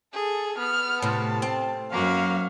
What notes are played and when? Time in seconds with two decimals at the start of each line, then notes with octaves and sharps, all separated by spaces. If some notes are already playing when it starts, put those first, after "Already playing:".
0.14 G#4 A4
0.58 B3 F6
1.02 A2 C3 A5
1.42 C4
1.92 F#2 A#3 F#4 F5